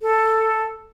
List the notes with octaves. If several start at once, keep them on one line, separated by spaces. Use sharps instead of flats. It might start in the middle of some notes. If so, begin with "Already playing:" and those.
A4